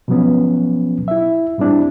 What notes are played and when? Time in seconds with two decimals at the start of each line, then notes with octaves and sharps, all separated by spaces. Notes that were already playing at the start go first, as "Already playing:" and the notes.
0.08 B2 F3 F#3 B3 C#4
1.08 E4 E5
1.58 A2 G3 C4 D4 E4